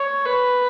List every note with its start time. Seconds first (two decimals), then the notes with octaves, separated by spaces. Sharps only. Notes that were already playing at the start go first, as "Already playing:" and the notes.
Already playing: C#5
0.26 B4